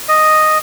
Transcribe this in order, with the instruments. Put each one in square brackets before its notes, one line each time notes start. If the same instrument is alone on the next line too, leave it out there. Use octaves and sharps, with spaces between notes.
[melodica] D#5